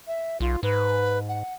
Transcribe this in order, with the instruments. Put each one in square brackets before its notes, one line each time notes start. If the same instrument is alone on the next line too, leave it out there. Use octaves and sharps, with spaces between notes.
[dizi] E5
[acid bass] B1 [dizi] F4
[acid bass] G#2 [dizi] B4
[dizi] F#5